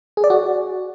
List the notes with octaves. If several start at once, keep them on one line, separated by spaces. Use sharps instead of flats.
G#4
D5
F#4